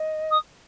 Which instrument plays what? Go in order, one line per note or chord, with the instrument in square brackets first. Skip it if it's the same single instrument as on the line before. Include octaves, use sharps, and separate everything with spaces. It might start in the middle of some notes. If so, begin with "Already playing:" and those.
Already playing: [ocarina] D#5
[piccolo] D#6